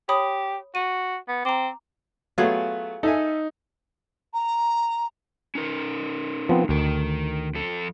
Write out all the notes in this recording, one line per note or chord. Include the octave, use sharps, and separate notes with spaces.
G4 C#5 B5 D#6
F#4 D#7
B3
C4 A#5 D6
F#3 A3 B3 F4 G#4
D#4 A4 E5 G#5
A#5
C#4 D#4 A#4
F3 B3 C4
D2 D#3 A#4
F2 A4